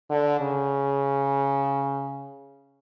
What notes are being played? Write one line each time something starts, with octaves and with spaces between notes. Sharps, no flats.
D3
C#3